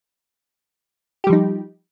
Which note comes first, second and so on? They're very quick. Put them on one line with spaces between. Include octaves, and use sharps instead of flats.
G4 G3 F3 D#4